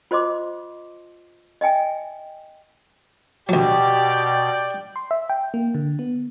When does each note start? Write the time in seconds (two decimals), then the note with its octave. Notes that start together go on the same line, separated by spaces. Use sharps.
0.11 F4 C5 D#5 C6 D6
1.61 D#5 E5 G5 G#5
3.49 D2 B2 F#3 G4 D5 G5
4.96 C6
5.11 E5
5.30 G5
5.54 A#3
5.75 D3
5.99 B3